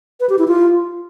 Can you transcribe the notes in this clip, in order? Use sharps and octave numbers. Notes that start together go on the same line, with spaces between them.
B4
G4
E4
F4